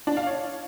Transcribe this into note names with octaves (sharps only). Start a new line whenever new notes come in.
D4
F5
C#5